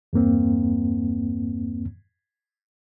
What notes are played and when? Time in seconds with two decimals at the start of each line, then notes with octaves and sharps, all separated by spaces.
0.13 E2 G2 A#3 C4